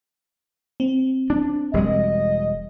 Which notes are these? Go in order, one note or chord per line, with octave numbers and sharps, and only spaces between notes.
C4
D4
E1 G3 G#3 D#5